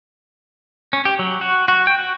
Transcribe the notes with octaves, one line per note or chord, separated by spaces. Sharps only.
C#4
G4
F#3
F#4
F#4
G5
F#4